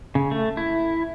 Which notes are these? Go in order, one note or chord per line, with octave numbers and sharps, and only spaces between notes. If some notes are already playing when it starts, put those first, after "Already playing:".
C#3
A3
E4